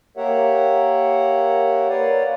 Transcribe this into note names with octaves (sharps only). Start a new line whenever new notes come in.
A#3 G4 A#4 C#5 E5 F#5
A#4 B4 C#5 D5 F5 F#5